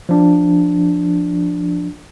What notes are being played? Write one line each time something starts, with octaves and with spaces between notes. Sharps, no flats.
F3 D4